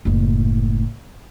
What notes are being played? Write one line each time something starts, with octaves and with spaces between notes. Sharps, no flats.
F#1 A2